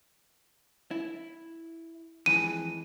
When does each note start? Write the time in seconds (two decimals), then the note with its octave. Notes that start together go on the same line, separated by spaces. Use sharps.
0.91 E4
2.26 F2 E3 G#3 D#7